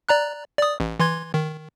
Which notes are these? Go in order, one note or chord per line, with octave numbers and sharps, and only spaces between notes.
D5 A#5 F#6
D5 D#6
A1
E3 C6 G#6
D#3